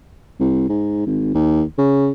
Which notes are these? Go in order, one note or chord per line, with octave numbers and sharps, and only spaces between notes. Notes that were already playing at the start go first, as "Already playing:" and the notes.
C2
G#2
G#1
D#2
C#3